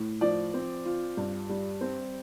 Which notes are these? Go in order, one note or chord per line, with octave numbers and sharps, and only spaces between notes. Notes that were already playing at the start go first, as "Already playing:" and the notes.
Already playing: A2
F3 D5
C4
F4
G2
G3
C4